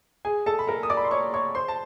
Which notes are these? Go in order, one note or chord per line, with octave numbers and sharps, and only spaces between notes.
G#4 G#5
A4 A5
B5
A#4 A#5
D#6
D5 D6
B5
C6
C#5 C#6
C#5 C#6
C5 C6
A5